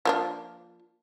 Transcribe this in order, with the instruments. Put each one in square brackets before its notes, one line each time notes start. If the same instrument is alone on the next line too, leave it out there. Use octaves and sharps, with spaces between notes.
[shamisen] F3 A#3 D4